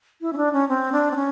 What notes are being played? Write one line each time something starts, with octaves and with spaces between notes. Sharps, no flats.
E4
C#4
D4
C#4
C4
D4
C4
C#4